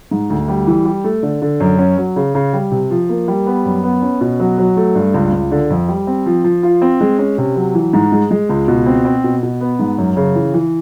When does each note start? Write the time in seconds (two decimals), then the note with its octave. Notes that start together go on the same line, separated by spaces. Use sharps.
0.11 G#2
0.30 D2
0.48 G3
0.67 E3
0.85 G3
1.04 A3
1.23 D3
1.42 D3
1.60 F#2
1.79 C#4
1.97 F#3
2.16 C#3
2.35 C#3
2.53 G3
2.71 C3
2.91 F3
3.09 A#3
3.28 G3
3.46 B3
3.65 F#2
3.84 B3
4.02 C#4
4.21 B2
4.40 F#3
4.58 F#3
4.77 A3
4.95 G2
5.14 C#2
5.33 C#2
5.51 D3
5.70 F2
5.89 G3
6.07 C4
6.26 F3
6.44 F3
6.63 F4
6.82 C4
7.01 G#3
7.19 C#4
7.38 C3
7.56 F#3
7.75 E3
7.93 G#2
8.12 G#3
8.31 G#3
8.49 C#2
8.68 B2
8.86 C4
9.05 C4
9.24 B2
9.43 B2
9.61 B3
9.79 G#2
9.98 F#2
10.17 C#3
10.35 E3
10.54 E3